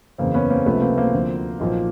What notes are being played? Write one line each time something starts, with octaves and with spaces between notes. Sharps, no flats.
F#1 E2 C#3 A#3 C4
B3 C#4
A#3 C4
C#2 C3 F3 A3 B3
A#3 C4
A#3 C4
D2 D3 F3
B1 A#2 F3